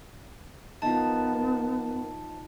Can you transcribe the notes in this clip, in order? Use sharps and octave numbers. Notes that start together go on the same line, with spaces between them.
F3 B3 D#4 A#4 A5